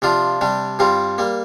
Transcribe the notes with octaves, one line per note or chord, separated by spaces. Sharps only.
C3 F3 D4 F4
C3 G3 D4
G2 G3 C4 F4
G3 A#3